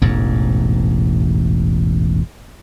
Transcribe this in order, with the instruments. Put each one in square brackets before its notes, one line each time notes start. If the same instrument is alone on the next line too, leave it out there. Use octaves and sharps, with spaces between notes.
[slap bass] E1 A1 G#2